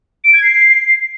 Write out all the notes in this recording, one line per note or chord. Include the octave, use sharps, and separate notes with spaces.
D7
G#6
C7